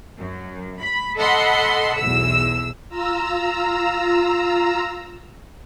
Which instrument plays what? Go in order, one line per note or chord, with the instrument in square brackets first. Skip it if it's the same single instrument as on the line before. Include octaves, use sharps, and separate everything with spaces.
[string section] F#2
B5
A4 D#5 F#5 B5 C6
B1 E2 E6
[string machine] F4 A#5 E6